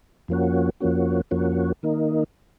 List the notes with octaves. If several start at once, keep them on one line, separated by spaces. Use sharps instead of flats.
F2 F3 A#3 C#4 F#4
F2 F3 A#3 C#4 F#4
F2 F3 A#3 C#4 F#4
D#3 A#3 D#4